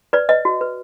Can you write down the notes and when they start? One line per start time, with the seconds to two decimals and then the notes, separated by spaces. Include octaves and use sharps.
0.13 B4 D5
0.29 B4 D#5
0.45 F#4
0.61 B4